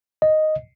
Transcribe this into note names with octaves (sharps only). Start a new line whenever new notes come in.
D#5